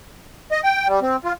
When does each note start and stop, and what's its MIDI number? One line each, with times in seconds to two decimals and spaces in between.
0.52 0.60 75
0.64 0.87 79
0.87 1.00 55
1.02 1.16 60
1.24 1.33 65